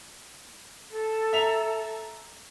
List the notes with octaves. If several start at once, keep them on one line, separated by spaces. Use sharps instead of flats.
A4
E5 A#5 F7